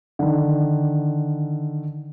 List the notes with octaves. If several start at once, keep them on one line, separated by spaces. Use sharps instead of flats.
D3 D#3